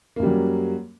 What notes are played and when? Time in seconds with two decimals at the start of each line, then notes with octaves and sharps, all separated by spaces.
0.16 A#3
0.20 F#2
0.23 G3
0.26 F#3